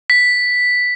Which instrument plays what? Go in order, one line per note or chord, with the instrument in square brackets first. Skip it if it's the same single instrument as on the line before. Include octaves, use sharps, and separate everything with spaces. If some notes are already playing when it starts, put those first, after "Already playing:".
[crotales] B6